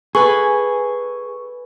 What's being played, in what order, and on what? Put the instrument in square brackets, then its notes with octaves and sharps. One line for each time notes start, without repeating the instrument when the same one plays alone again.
[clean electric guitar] G#4 [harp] A4 B4 G#5 [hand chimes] C#6